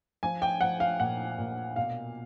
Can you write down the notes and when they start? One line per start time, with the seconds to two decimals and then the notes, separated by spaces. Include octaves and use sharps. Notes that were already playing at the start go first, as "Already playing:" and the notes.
0.23 F3 G#5
0.42 G5
0.61 F3 F#5
0.80 F5
1.00 A#2 F#5
1.38 A#2
1.76 B2 F5